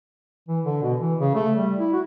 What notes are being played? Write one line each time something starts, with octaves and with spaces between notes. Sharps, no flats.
E3
D3
B2
E3
C#3
A3
G3
E4
F#4